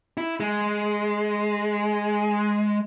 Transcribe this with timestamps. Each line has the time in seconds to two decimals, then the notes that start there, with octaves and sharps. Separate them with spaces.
0.17 E4
0.40 G#3